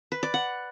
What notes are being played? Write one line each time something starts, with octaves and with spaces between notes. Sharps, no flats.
B4
D5
F#5